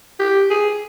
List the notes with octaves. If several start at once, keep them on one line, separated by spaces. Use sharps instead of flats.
G4
G#4